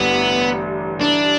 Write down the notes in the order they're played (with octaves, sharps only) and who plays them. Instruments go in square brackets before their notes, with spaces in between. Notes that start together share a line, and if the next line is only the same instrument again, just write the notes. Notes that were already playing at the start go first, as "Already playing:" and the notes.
Already playing: [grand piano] A1 G2 D3 G3 D4 [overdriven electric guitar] B3
[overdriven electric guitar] D4